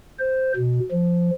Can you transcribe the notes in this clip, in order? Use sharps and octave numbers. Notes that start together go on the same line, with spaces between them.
C5
B2
F3